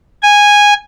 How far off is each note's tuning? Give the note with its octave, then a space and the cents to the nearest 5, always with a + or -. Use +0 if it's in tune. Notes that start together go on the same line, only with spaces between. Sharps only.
G#5 -10